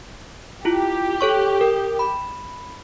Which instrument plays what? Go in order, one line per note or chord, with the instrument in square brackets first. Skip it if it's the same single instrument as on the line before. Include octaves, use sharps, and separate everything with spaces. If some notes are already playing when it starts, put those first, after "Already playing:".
[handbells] E4 F4 [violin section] G4
[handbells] A4 C#5 C#6
A#4
B5